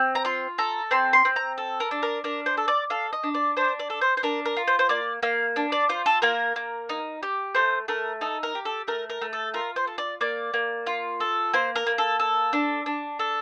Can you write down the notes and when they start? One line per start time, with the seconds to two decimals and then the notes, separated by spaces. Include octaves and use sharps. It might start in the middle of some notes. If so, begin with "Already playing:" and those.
Already playing: C4
0.15 A#5
0.25 F4 C6
0.58 A4 A#5
0.91 C4 C6
1.13 C6
1.25 C4
1.36 A#5
1.58 A4
1.80 A#4
1.91 D4
2.03 A#4
2.24 D4 A#4
2.46 C5
2.57 A4
2.68 D5
2.90 A4 F5
3.13 D#5
3.23 D4
3.34 D5
3.57 D4 C5
3.79 D5
3.90 A4
4.01 C5
4.17 C5
4.23 D4 A#4
4.45 A#4
4.57 F4
4.68 C5
4.79 C5
4.89 A#3 D5
5.23 A#3 F5
5.56 D4
5.72 D5
5.89 F4 C5
6.06 A4
6.22 A#3 A#4
6.56 A#3
6.89 D#4
7.23 G4
7.55 A3 C5
7.88 A3 A#4
8.21 D#4 A4
8.43 A#4
8.55 G4
8.65 A4
8.88 A3 A#4
9.10 A#4
9.22 A3
9.33 A4
9.54 F4 A#4
9.76 C5
9.87 A4
9.98 D5
10.21 A#3 D5
10.54 A#3
10.87 F4
11.20 A4
11.53 A#3 C5
11.76 A#4
11.87 A#3
11.98 A4
12.19 A4
12.53 D4
12.86 D4
13.19 A4